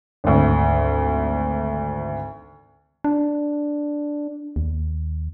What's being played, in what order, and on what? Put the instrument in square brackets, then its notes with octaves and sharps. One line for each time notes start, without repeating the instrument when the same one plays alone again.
[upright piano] G#1 D2
[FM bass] D4
D#2